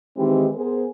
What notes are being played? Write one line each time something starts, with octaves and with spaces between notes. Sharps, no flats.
D#3 E3 G#3 C4 D#4 G4
B3 G#4 A#4 C5